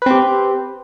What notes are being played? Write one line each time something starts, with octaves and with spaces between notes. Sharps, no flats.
C4 G4 B4